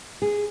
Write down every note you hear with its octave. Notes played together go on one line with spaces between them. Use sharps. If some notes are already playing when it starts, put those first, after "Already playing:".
G#4